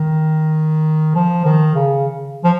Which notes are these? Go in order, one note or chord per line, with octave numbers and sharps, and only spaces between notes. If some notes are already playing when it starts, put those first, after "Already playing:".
Already playing: D#3
F3
D#3
C#3
F3